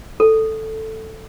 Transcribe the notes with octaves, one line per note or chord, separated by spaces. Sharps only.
A4